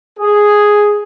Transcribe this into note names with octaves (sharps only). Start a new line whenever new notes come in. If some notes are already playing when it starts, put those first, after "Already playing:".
G#4